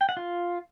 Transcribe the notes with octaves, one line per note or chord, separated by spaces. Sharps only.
G5
F#5
F4